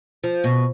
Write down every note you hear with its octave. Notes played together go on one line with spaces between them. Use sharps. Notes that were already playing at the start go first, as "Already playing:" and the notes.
F3
B2